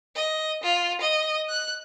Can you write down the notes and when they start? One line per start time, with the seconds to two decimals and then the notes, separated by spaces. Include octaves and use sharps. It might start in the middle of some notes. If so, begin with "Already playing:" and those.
0.16 D#5
0.63 F4
1.01 D#5
1.49 F#6